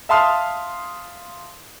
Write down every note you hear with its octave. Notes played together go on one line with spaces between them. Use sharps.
E5 F5 A5 C6 D#6 F6